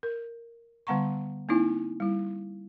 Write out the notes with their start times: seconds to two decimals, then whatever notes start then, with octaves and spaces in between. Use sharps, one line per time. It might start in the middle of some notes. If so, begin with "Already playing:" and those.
0.03 A#4
0.87 D3 G3 B3 F#5 A#5 C#6
1.49 A#3 C4 D#4 E4
2.00 G3 E4